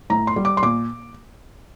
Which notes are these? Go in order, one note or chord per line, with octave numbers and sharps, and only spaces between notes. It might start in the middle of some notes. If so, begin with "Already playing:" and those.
A2 A#5
C6
G3
D6
C6
A#2 D6